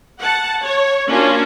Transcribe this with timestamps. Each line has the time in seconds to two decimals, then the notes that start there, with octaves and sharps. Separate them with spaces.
0.19 F#5 A5
0.62 C#5
1.08 A#3 C#4 D4 F4 F#4